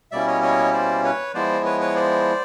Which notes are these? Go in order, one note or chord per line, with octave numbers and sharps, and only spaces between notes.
B2 G3 A#3 C#4 E4 D5 E5
C#5 D#5
C#5 D#5
C5 D5
B4 C#5
F3 G#3 B3 E4 C5 D5
B4 C#5
B4 C#5
C5 D5